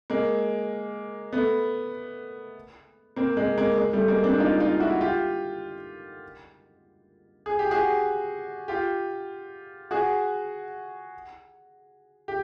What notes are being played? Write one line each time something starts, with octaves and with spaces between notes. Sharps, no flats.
G#3 A#3
A3 B3
A#3 C4
G#3 A#3
G#3 A#3
G#3
G3 A3
G#3 A#3
C4 D4
D#4 F4
D#4 F4
E4 F#4
F4 G4
G#4
G4
F#4 G#4
F4 G4
F#4 G#4
G4